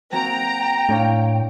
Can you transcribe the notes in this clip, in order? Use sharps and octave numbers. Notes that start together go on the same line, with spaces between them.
A#3 C4 F#4 G5 A#5
A2 D4 C#5 F5